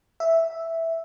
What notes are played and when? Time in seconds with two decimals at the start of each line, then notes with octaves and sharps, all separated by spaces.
0.20 E5